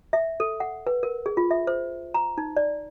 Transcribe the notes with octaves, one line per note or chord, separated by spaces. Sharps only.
E5
A4
F#5
B4
A#4
G#4
F4
E5
C5
A#5
D#4
D5